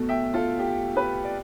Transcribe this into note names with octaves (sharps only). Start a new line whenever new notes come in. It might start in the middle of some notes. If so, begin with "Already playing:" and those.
Already playing: B2 A3
E5 G5
F4 A4
G4
G4 B4
D5